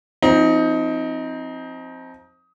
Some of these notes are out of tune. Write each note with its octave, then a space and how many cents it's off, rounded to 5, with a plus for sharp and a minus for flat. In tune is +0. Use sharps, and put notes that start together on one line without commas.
F3 +0 C4 +0 D#4 +20